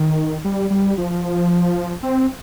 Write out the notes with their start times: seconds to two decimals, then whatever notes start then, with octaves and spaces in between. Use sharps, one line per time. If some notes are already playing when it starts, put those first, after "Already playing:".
Already playing: D#3
0.45 G3
0.70 G3
0.98 F3
2.03 C4